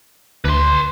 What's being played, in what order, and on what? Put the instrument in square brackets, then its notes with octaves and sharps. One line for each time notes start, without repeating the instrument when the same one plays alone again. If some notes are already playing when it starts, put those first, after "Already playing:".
[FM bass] D2 [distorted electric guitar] B4 C6